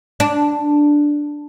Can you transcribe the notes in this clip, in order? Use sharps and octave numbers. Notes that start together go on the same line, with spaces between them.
D4